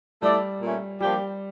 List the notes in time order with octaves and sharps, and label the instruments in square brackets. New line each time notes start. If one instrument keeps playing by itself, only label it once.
[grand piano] G3 [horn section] A3 E4 A4 D5
[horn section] A#2 A3 C#4
[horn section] F3 A#3 D4 G4 [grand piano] G3